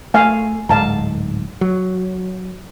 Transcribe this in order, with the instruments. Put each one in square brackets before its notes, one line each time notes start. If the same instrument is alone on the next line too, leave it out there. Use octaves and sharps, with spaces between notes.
[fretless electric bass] A3 [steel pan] F5 G#5
[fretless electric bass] D1 G#2 [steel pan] F5 A5 A#5
[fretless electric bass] F#3